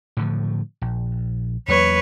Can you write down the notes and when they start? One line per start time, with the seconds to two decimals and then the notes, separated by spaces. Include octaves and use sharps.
0.17 A2 D3 F3
0.82 A#1
1.68 E2 F#3 A#3 B4 C#5